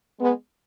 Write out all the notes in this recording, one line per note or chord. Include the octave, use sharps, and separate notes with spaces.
G#3 B3